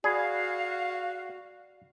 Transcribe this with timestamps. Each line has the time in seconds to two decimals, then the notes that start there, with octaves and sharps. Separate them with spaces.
0.04 F#4 G#4 D5 F5 B5 G#6